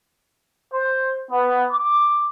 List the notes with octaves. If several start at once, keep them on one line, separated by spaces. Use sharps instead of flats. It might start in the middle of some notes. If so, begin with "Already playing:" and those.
C5
B3
D6